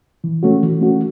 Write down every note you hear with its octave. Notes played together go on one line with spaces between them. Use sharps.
E3
A3 C#4 F#4
E3
A3 C#4 F#4